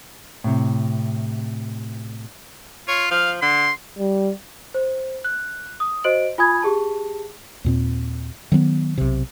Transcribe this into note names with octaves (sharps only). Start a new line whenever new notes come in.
A2 C3
F4 C#5
F3 F5
D3 C6
G3
C5
F#6
D#6
F#4 C5 D#5 D7 F#7
F4 G#5 B5 D#6 G#6
G4 G#4 A5
D#2 A#2 C4
D#3 F#3 A#3 B3
B1 C3